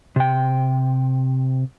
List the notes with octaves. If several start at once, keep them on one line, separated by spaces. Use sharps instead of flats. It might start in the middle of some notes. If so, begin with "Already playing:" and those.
C3 G5